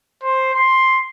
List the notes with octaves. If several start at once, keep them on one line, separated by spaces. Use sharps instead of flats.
C5
C6